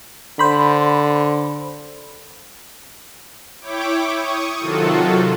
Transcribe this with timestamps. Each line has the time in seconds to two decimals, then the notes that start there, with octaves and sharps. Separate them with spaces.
0.39 D3 C5 B5
3.61 E4 C#5 G5 D6
4.13 C#6 D#6
4.60 C3 D#3 F#3 F4 F#4 A4